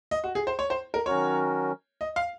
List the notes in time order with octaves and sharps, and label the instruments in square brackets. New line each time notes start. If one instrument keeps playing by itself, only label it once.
[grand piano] D#5
F#4
G#4
C5
C#5
C5
A#4
[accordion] D#3 F#3 C#4 F#4 A#4 [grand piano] C#5
[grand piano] D#5
F5